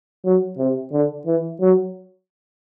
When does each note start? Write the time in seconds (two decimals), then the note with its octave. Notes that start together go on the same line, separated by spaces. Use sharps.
0.24 F#3
0.58 C3
0.92 D3
1.26 E3
1.61 F#3